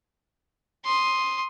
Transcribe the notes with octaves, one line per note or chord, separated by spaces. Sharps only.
C6 D#6